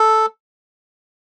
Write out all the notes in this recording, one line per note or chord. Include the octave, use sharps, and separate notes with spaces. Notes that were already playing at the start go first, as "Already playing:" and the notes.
Already playing: A4